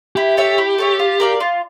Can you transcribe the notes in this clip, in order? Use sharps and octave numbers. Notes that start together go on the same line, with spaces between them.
E4 G4
A4 C#5 E5
E4
A4 C#5 E5
F4
A#4 D5 F5
F4